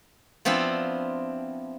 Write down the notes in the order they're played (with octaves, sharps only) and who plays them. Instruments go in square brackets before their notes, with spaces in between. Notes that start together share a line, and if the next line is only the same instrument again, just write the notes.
[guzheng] F3 B3 C4 D4 E4 F4